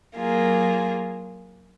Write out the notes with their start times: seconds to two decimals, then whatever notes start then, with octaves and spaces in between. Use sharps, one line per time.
0.15 F#3 A#3 F4 G#4